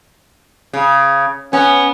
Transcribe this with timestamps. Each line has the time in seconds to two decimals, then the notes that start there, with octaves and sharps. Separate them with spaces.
0.73 C#3
1.53 B3 C#4